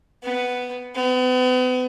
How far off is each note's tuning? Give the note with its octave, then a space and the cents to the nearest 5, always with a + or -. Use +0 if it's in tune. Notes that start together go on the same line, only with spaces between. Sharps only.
B3 +5
B3 +40